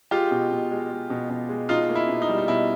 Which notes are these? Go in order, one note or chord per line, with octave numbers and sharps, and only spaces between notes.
G#3 F4 G4
B2
B2
G#3
G#3
B2
B2
G#3
B2 D#4 F4
A#3
E4
B2
D#4
G3
D#4
B2 E4